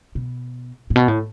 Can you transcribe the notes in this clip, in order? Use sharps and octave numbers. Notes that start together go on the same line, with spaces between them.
B2
A2
B2
A2